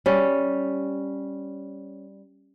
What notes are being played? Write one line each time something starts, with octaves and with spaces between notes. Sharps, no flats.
G3 C#4